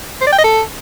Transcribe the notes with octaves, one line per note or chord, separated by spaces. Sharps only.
C5
D5
G5
D#5
A4